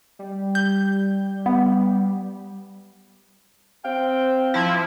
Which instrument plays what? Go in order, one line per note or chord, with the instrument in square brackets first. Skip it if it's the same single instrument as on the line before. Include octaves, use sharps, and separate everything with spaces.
[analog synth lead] G3
[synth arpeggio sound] G6
B3
[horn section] C4 F5 G5
[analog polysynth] F3 E4